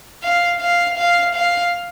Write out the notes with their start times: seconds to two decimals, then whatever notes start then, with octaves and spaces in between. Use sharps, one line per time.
0.23 F5
0.61 F5
0.97 F5
1.35 F5